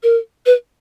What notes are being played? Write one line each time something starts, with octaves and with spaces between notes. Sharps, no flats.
A#4
B4